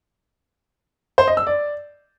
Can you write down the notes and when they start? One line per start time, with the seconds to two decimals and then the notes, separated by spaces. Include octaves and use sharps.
1.18 C5
1.28 D#5
1.37 E6
1.47 D5